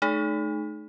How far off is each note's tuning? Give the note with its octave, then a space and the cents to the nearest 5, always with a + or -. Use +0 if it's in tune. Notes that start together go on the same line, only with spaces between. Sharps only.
A3 -25 D#4 -15 G#4 +40